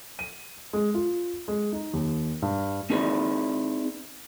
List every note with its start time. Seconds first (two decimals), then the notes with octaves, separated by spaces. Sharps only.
0.19 D#7
0.73 G#3
0.94 F4
1.48 G#3
1.72 D#4
1.93 D#2
2.42 G2
2.90 C4 D#4 E4 G#4 B4 D5